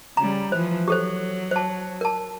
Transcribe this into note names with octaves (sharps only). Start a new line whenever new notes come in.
C#3 G3 A#5
E3 F3 C5
F#3 G4 A4 C5
C5 A5
A#4 A5